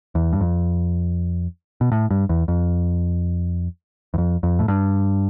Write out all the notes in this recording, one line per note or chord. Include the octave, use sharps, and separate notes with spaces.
E2
G2
F2
B2
A2
G2
E2
F2
E2
F2
F2
A2
G2